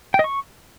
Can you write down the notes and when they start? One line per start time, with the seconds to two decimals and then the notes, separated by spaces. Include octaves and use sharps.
0.14 G5
0.19 D#5
0.24 C#6